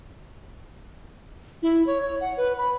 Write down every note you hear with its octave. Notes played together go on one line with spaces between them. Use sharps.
E4
C#5
C#5
F#5
B4
B5